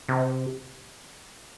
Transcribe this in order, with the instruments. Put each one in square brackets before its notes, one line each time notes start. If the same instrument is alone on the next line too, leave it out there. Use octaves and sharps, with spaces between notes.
[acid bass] C3